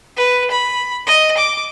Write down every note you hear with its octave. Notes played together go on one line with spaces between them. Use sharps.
B4
B5
D#5
D6